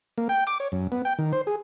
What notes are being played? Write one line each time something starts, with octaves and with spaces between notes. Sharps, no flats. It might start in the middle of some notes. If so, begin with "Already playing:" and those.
A#3
G5
D6
C#5
F#2
B3
G5
D#3
C5
G#4